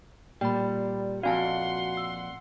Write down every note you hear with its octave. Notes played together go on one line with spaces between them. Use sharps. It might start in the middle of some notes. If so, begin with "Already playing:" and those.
A#2 G3 G5 B5
F2 C3 F#4 F5 F#5 G#5 A5 C6
E6